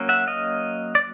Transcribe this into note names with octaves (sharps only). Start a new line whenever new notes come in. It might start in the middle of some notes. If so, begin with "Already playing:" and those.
Already playing: F#3 A#3 C#4
E5 F#5
D#5 F5
D5